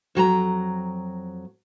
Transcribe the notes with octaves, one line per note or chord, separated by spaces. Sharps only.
F2 F#3 A5 A#5